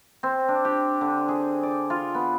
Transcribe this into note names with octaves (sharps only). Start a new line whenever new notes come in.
C4
D4
G4
D3
G#4
D5
F4
B3